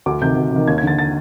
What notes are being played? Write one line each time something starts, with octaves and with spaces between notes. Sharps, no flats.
D2 D6
C3 D#3 G6
D2
C3 D#3
D#2 G#6
G#6
D3 A6
A6